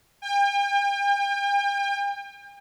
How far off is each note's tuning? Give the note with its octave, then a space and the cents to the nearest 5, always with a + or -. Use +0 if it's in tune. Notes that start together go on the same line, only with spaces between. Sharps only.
G5 +40